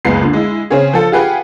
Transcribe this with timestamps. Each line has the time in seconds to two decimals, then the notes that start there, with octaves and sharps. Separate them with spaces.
0.05 F#1 C#2 G#3 B3 C7
0.21 A#2 D3
0.33 G#3 E4
0.70 C#3 C4 C#4 G#4
0.93 F3 A4
1.12 F4 G4 G#4 B4 F#5 G5